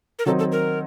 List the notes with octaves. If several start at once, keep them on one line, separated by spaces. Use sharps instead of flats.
A#4
D#3 F#3 C4 D#4 A4
A4
A#4